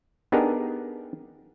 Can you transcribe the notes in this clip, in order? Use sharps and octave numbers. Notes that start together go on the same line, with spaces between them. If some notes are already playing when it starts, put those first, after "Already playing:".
B3 D4 D#4 G4 G#4 A#4